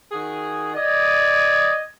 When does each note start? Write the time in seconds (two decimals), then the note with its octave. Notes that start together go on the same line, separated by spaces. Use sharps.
0.12 D#3 F#4 G#4
0.75 D5 D#5 G#6